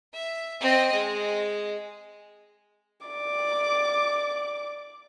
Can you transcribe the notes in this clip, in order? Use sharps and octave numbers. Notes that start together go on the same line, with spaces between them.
E5
C4 D#5
G#3
D5 D6